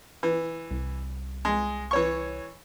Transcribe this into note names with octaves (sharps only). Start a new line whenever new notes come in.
E3
C2
G#3
E3 C#5 C#6